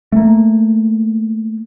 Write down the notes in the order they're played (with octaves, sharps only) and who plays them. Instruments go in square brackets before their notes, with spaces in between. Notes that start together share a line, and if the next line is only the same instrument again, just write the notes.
[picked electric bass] A3 A#3